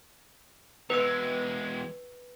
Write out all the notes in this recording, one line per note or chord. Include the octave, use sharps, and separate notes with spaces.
E2 G#3 B4 E6